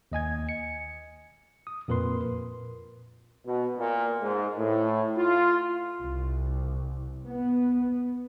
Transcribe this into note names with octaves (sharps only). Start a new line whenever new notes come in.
D#2 D#5 G#5 G#6
C#7
D#6
F2 A#2 A#4 B4 C6
B2
A#2
G#2
A2
F4
C2
B3